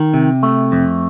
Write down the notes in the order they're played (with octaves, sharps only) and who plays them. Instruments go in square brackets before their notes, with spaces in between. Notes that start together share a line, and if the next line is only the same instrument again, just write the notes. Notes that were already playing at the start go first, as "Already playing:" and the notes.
Already playing: [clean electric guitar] D#3
C3
A3
F2